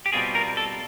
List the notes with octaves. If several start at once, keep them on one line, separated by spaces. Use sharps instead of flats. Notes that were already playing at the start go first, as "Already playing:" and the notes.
G4
B2 G3 C4 F4 G#4
A#4
A4